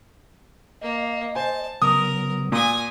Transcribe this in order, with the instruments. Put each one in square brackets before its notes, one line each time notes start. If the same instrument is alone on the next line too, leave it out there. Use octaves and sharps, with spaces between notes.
[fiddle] A#3 [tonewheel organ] D#5
[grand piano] C5 G#5 [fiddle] A5
[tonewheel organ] C#3 F#3 B3 [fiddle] A#4 [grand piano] D#6
[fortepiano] A#2 [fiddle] G#5 D#6